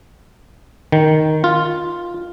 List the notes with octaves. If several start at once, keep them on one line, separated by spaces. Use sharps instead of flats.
D#3
F4